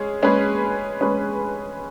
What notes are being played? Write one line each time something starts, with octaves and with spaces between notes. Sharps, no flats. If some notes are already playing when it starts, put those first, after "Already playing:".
Already playing: G#3 C#4 G#4
G#3 C#4 G#4 B4
G#3 C#4 G#4 B4